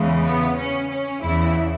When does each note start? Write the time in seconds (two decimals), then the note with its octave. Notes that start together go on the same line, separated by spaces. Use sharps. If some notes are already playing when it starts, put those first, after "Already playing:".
Already playing: E2 C#3 E3 G#3
0.25 B3
0.56 C#4
0.89 C#4
1.21 E2 C#3 E3 E4